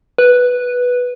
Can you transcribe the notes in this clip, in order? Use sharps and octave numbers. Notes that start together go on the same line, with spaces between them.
B4